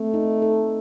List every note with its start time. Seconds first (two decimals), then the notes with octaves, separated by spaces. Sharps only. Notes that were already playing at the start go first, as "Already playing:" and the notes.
Already playing: A3 C4
0.14 D#4
0.42 A4